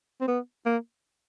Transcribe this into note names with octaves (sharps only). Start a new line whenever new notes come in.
C4
B3
A#3